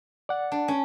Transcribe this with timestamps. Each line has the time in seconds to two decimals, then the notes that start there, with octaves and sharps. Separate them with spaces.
0.29 D5 F#5
0.52 D4
0.68 C#4